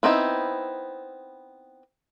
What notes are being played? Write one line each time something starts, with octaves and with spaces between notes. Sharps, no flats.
B3 C4 D#4 E4